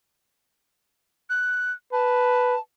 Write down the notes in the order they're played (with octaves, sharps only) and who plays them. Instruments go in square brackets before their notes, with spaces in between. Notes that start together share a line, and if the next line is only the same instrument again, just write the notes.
[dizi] F#6
[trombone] B4 [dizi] A5